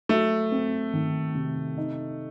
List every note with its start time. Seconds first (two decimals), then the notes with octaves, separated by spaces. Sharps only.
0.09 F#3 A3
0.52 C4
0.93 D#3
1.35 C3
1.77 D#4